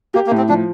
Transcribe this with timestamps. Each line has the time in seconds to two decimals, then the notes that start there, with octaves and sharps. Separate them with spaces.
0.14 A#3 G4
0.27 A#3
0.31 A2
0.38 C4
0.49 F3 D4